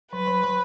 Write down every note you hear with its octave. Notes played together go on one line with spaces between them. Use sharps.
F#3 B4
F#3
F#3